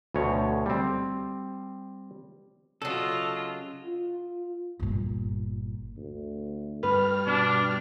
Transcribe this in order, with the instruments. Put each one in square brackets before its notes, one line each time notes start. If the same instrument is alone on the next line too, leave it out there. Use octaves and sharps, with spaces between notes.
[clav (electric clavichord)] D2 B2 C#5
G3 C4
[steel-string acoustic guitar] C#3 F#3 [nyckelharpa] F4 D#5 [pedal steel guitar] A4
[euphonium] F4
[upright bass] G1 A#2
[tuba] D2
[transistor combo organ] G2 F6 [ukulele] B4
[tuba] B2 [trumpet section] D4